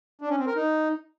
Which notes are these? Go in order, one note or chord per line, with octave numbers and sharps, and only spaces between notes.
D4
C#4
C4
A#4
D#4